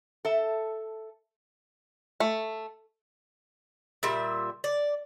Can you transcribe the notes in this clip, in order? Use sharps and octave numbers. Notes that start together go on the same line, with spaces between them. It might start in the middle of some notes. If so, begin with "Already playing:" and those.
A4 E5
A3
A#2 G3 E5
D5